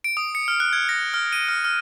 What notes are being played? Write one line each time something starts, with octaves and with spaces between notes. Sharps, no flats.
D7
D#6
C#7
F6
F#6
G#6
A#6
F6
D#7
F6
F6